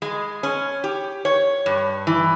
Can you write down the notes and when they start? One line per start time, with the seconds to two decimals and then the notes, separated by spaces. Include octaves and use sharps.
0.02 G#3
0.43 C#4
0.84 G4
1.25 C#5
1.66 G2
2.07 E3